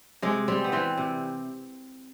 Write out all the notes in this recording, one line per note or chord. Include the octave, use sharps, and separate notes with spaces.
C3 G#3
G3 C4
B3
E3 C4
C3